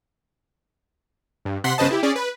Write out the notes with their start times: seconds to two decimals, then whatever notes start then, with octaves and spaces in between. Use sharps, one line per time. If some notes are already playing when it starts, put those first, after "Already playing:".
1.45 G2
1.64 C3 F#5 C6 B6
1.78 G1 C#3 B4 C5 D#5 A5
1.91 E4 G4
2.03 C#4 G#4 D5
2.16 B4